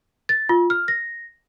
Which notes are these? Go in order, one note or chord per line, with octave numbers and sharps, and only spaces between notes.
A6
F4
F6
A#6